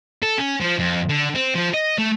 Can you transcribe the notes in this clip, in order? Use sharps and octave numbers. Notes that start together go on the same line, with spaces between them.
A4
C#4
F3
F2
D3
C4
F3
D#5
A3